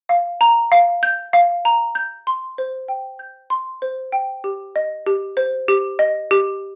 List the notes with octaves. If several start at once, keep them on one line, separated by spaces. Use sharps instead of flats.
F5
A#5
F5
G6
F5
A#5
G6
C6
C5
G5
G6
C6
C5
G5
G4
D#5
G4
C5
G4
D#5
G4